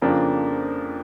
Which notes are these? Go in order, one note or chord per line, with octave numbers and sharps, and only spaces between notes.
F2 C#3 F3 A#3 D4